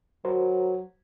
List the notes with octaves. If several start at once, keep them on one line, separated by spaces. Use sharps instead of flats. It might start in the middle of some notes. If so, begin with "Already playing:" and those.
F#3 F#4 A#4 C5